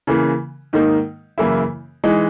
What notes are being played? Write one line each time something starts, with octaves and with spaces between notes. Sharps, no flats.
C#3 E3 A#3
G#2 D#3 A#3 D#4
F#2 C#3 E3 A#3 E4
E3 G#3 D#4